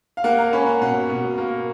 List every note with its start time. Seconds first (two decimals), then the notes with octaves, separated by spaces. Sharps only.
0.17 F5
0.24 A#3 F#5
0.39 A#5
0.53 C#4 B5
0.66 F#5
0.81 B2 F#5
1.10 B2
1.38 A#3